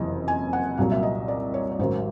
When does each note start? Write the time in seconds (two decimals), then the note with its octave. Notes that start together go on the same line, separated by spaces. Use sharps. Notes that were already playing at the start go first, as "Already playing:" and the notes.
Already playing: F#1 F2 C3 E3 D#5
0.28 G#5
0.53 F#5
0.77 C2 A#2 F#3 F5
0.92 E5
1.03 D#5
1.28 D5
1.54 C#5
1.71 C#5
1.79 A1 G#2 D#3 F#3 C5